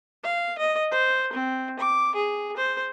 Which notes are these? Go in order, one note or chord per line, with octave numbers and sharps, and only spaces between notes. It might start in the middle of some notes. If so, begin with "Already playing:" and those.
F5
D#5
C5
C4
D6
G#4
C5